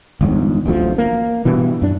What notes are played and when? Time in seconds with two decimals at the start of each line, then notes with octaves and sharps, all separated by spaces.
0.21 G1 E2 G#2
0.65 D1 A1 D2 F3
0.98 A#3
1.45 G2 B2 E3
1.82 F#2 D4